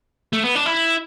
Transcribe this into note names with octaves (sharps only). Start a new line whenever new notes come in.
A3
B3
D4
E4